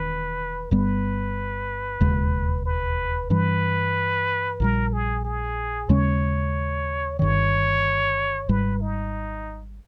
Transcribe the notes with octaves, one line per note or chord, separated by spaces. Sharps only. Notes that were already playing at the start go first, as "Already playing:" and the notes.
Already playing: E1 E2 D#3 B4
G1 G2 G3 B3 B4
E1 D#2 C#3 G#3
B4
G2 E3 G3 B4
A#1 A#2 G3 A#4
G#4
G#4
D#2 C#3 G#3 C#4 C#5
G1 G2 D#3 C#5
G#1 G#2 G3 B4
D#4